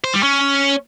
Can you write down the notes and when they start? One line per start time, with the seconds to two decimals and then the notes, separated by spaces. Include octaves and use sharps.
0.04 C5
0.14 G3
0.23 C#4